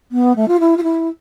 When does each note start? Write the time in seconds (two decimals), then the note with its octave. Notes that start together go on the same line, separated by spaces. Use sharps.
0.11 B3
0.36 A3
0.48 F4
0.60 E4
0.77 F4
0.83 E4